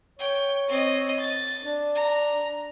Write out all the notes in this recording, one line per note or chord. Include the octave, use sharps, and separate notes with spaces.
C#5 G5
C4 D#5
A6
D4
A#5